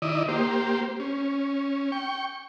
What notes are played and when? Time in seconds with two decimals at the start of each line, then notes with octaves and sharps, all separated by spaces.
0.02 D#3 E4 D5 D#5
0.28 A#3 G4 C5
1.00 C#4
1.92 G5 C#6